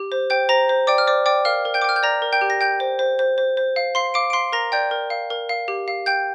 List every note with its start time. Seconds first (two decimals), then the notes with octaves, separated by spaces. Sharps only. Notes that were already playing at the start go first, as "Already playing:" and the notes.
Already playing: G4
0.12 C5
0.30 C5 G5 G6
0.49 C5 A#5 A#6
0.69 C5
0.87 D5 G5 D6
0.98 F6
1.07 C5 D5 D6
1.26 D5 G5 D6
1.45 A#4 F5 F6
1.65 A#4
1.74 G5 G6
1.82 D6
1.84 G5 F6
1.96 G6
2.03 D5 A#5 A#6
2.22 A#4
2.33 G5 G6
2.41 G4
2.50 A#6
2.61 G5 G6
2.80 C5
2.99 C5
3.19 C5
3.38 C5
3.57 C5
3.76 F5
3.95 F5 C6 C7
4.14 F5 D6 D7
4.30 D7
4.33 F5 C6 C7
4.52 A#4 A#5 A#6
4.72 D5 G5 G6
4.91 A#4
5.10 F5
5.30 A#4
5.49 F5
5.68 G4
5.88 F5
6.06 G5 G6